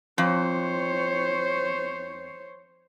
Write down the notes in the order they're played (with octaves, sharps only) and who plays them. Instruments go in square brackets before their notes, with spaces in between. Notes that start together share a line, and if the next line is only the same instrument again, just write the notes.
[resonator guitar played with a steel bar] F2 [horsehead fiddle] C5 C#5